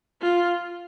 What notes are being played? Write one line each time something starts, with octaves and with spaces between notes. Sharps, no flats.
F4